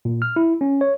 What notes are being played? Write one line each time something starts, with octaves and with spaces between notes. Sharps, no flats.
A#2
F6
E4
C#4
C#5